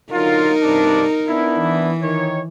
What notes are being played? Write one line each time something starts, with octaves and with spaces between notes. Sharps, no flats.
D3 F#3 D#4 F4 A#4
G2 C3 D4
B3 D4 E4
E3
D#3 C#5